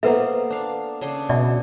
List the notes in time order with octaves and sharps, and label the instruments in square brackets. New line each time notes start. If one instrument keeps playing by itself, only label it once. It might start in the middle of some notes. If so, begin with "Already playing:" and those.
[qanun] A#3 B3 [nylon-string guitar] A4 C5 [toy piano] B4 E5
[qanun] D4 F5
C#3 D4 C6
[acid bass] B2 [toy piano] D5 E5